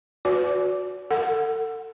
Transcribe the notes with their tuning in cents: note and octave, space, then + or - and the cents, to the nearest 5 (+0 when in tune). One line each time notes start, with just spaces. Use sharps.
F#4 -15 B4 +25 D5 -35
A4 +30 F#5 +0